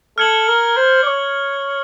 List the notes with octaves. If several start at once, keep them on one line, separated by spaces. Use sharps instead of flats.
A4 F6 G#6 C#7 F#7
A#4
C5
D5
C#5